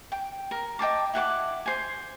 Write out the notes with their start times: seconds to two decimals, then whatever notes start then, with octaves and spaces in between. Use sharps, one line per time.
0.12 G5
0.51 A#4
0.79 D#5 G5 A5 D6
1.14 E4 F#5 G5 D6
1.66 C5 G#5